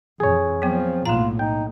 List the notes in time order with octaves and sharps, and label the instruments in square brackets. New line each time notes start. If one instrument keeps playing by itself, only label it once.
[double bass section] F2 E3 [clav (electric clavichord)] G#4 C#5
[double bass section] F3 [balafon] F#3 B3 [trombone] C4
[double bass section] B1 A2 [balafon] A#3 A#5 [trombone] F4
[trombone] D#4 [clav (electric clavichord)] G5